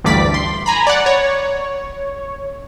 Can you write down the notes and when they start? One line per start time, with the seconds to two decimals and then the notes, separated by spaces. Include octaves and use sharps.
0.04 A1 D2 G2 D5 B6
0.34 C6
0.66 G#5 A#5 B5
0.87 D5 F#5
1.06 C#5